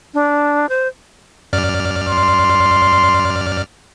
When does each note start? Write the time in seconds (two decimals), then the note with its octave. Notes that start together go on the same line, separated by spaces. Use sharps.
0.14 D4
0.69 C5
1.53 F#2 D5 F6
2.08 C6